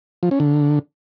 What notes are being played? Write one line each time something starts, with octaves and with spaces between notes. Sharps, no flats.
F3
C#4
D3